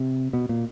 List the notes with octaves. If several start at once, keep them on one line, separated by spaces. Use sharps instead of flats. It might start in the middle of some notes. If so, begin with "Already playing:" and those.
Already playing: C3
B2
A#2